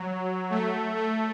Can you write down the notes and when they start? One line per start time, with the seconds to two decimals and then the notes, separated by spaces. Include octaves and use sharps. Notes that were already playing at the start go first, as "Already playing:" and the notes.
Already playing: F#3
0.50 A3
0.97 A3